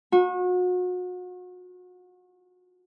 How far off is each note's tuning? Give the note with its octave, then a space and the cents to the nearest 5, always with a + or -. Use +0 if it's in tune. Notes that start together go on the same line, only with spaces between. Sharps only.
F#4 -35